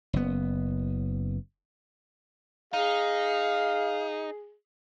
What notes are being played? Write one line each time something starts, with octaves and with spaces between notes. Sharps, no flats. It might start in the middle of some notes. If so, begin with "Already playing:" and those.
F#1 B3
D#4 G#4 F5